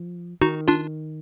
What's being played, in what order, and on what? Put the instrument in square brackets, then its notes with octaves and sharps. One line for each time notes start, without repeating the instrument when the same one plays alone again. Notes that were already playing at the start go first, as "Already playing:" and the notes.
Already playing: [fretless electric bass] F3
[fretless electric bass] D#3 [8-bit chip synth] D#4 F#4
[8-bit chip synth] D4 F4